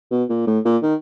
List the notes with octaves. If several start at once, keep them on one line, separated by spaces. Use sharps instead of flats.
B2
A#2
A2
A#2
D#3